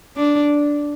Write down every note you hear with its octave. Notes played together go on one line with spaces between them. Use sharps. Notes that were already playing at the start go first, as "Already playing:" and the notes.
D4